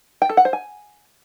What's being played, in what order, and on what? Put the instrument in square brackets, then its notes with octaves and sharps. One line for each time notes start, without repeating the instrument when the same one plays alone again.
[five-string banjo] G5
A4
F#5
C5
G#5